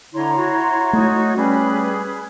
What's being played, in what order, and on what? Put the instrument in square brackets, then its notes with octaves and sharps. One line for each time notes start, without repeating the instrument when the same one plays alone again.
[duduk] D3 [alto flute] E4 [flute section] C#5 A#5 C6
[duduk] F#4
[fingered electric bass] A3 [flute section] D#4 C#5
[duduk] G3 [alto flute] C#4 [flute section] G#4 B4 B5